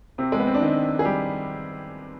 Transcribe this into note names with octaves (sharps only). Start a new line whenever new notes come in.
C3 C4
G#3
B3
C4
D4
D#3 D#4
G#4
G3 G4